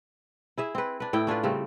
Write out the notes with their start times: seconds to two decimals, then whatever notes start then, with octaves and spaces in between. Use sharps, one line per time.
0.58 E4 G#4 E5
0.75 C4 B4
1.00 D4 B4
1.13 A2 E4 G5
1.27 C#4 D4 F4 B4
1.43 C#3 G3 A3 C4